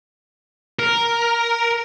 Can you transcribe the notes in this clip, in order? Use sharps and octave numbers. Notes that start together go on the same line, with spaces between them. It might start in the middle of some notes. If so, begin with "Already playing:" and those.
A#4